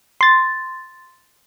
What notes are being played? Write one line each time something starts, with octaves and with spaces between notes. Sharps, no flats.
C6 A6